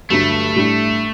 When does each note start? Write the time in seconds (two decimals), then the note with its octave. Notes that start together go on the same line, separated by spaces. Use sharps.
0.10 G2 D3 F#3 A3
0.56 A2 G3 D4